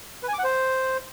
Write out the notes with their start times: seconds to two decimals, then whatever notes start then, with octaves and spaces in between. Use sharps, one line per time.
0.23 B4
0.28 G#5
0.33 D6
0.39 F#5
0.44 C5